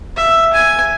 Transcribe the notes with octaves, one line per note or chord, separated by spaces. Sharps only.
E5
G#5